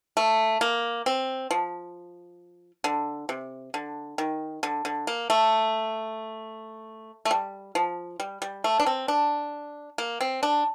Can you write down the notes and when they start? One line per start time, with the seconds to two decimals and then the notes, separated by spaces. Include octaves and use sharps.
0.17 A3
0.61 A#3
1.06 C4
1.51 F3
2.84 D3
3.29 C3
3.74 D3
4.18 D#3
4.63 D3
4.85 D3
5.07 A#3
5.30 A3
7.25 A3
7.31 G3
7.75 F3
8.20 G3
8.42 G3
8.64 A3
8.80 D4
8.86 C4
9.08 D4
9.98 A#3
10.21 C4
10.43 D4